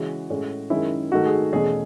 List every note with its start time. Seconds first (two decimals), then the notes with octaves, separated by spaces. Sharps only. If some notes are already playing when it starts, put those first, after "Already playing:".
Already playing: C#3 E3 G#3 C#4 F#4
0.30 A2 G#3 C#4
0.70 F#2 D#3 G#3 C#4 E4
1.11 G#2 D#3 A3 F#4
1.26 G#4
1.53 E2 B2 A3 C#4 G#4